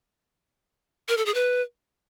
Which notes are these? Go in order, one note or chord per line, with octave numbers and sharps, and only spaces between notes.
A#4
A4
G#4
B4